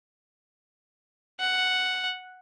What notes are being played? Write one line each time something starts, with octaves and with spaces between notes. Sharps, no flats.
F#5